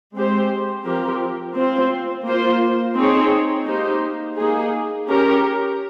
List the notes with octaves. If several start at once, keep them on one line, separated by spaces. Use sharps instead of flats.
G#3 C4 G4 C5
F3 C4 G4 A#4
C4 F4 C5
A#3 F4 C5
C4 D#4 G#4 C#5
A#3 D#4 G4 C5
A#3 D#4 G#4
C#4 G4 A#4